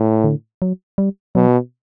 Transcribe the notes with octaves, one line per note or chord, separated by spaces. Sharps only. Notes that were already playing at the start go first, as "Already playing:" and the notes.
Already playing: A2
D3
F#3
G3
B2 F#3